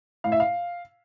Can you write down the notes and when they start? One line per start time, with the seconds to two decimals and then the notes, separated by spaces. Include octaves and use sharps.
0.24 A2 F5
0.32 E5
0.40 F5